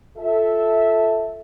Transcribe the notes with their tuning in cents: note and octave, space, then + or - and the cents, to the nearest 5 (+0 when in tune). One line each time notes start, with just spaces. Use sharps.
F4 +0 A4 +0 E5 -10